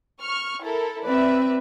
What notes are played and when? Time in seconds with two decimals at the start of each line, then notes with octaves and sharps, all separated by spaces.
0.21 C#6 F6
0.61 E4 A4 A#4
1.05 C4 B4 D5 E5